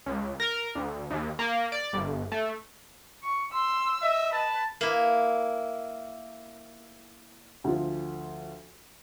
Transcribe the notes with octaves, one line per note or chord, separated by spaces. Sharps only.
C#2
A#4
D2
D#2
A#3
D5
G1
A3
C#6
C6 E6
D#5 E5
B4 A5
A#3 E4
D2 F3